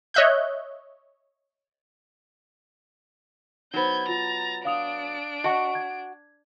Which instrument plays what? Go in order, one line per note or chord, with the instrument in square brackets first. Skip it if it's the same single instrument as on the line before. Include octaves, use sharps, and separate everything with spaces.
[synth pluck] C#5 D#5 E5 F#6 G6
[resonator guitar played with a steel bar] F#3 B3 [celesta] D#4 C5 [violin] G6 G#6
[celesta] F4 [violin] A#5 A6
[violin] D4 D7 [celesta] F5 D#6 F7
[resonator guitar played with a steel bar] F#4 F#5 [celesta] D#5 A5 C#6
[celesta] G#6